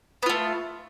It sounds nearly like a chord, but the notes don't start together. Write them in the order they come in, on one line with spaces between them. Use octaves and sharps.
B3 F4 A3